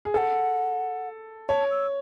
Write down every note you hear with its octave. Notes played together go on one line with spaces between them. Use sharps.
G#4
A4 F#5 G#5
C#5 A5
E6